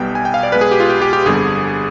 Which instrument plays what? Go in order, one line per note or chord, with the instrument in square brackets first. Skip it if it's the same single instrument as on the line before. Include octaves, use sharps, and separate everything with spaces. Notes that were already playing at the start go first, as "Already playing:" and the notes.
Already playing: [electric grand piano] B1 B2 G3 B3 G5
G#5
G5
F5
D5
B1 B2 G#3 B3 B4
G#4
G4
F4
G4
G4
G4
G1 F2 D3 G3 B3 G#4